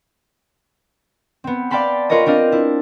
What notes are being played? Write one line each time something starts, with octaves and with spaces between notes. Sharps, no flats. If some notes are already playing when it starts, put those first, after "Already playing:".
B3 C4
D5 F5 G5 A5 B5 C6
F4 A#4 B4 C#5 D#5
C4 D4 D#5 F5
E4